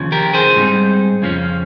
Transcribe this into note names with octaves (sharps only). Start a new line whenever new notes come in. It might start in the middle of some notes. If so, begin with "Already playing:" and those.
Already playing: D#2 C#3 F3
G4 A#4
G#4 C5
G#2 G3 C4 D#4
F2 C#3 F3 A#3 C#4